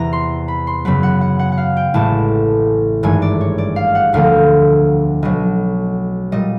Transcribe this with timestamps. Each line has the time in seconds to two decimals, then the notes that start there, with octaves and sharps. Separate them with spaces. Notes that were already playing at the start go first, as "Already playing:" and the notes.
Already playing: E2 C3 E3 A#5
0.13 C6
0.48 B5
0.67 C6
0.85 F#2 C#3 F#3 B3 B5
1.03 F#5
1.21 F#5
1.39 F#5
1.52 F#5
1.58 F5
1.77 G5
1.94 A1 A2 E3 G#3 A5
3.03 G#1 G2 E3 A3 G#5
3.22 D5
3.41 C#5
3.58 D5
3.76 F5
3.95 F#5
4.13 E1 D2 D3 F3 A3 F5
5.23 B1 B2 F#3 D#5
6.32 A#2 G3 D#5